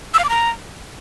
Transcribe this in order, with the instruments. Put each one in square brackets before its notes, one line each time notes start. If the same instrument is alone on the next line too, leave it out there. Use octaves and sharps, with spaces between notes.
[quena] E6
F5
D6
A#5